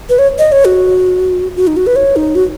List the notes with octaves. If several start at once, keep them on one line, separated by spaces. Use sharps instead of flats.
B4
C#5
D#5
C#5
F#4
F#4
D#4
F#4
B4
C#5
D#4
F#4